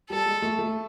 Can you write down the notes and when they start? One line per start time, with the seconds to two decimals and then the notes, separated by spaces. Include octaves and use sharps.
0.10 G3 A4
0.26 G#3
0.42 A3
0.59 A3